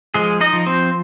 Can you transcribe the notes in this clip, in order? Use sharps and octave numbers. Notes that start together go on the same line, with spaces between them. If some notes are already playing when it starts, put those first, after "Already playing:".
F3 G#3 G#4
D#4 D#5
F3
C4 C5